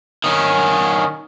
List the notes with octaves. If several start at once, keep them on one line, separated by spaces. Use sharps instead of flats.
D#3 C#4